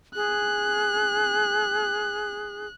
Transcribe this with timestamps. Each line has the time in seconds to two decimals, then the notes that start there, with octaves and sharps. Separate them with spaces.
0.15 G#4 F#6